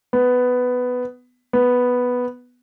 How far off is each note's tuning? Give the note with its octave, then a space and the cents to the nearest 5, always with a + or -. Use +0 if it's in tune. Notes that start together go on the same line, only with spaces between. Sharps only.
B3 +10
B3 +0